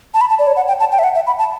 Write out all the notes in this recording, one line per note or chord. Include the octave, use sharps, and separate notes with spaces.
A5
B5
A5
D5
C#5
F#5
G5
A5
G5
E5
F#5
E5
B5
A5